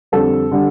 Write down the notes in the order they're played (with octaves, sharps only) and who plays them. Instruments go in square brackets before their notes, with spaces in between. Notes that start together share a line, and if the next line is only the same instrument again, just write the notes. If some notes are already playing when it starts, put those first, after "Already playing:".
[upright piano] F2 D3 G3 A4
D3 G3